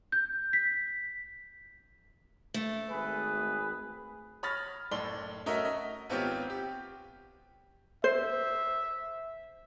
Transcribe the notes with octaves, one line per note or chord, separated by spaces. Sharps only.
G6
B6
A3
G#1 G#4 B4
C#5 B5 D#6 F6 A6 A#6
F#1 A2 D5 C6 G7
A3 C#4 F#4 A#4 D#5 E5
D#5
G#1 B3 C4 F4 G4 C#5
G4
C5 E5